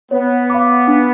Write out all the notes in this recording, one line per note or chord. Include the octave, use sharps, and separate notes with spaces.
B3 C#5
F5 B5 D6
D4